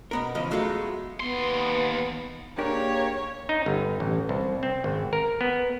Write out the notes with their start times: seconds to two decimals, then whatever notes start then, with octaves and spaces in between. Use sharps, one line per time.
0.11 B2 B3 A#4
0.35 C#2 E3 F3 D#5
0.51 F#3 G#3 A3 B3 F4 F#4
1.20 D#2 B3 C6
2.59 A#3 D4 G4 G#4 A#4 C#5
3.49 D#4
3.66 G1
4.00 A1
4.29 C2
4.63 C4
4.84 G#1
5.13 A#4
5.41 B3